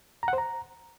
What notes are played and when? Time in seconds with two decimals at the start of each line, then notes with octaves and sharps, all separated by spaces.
0.23 A#5
0.28 F#5
0.33 C5
0.38 A#5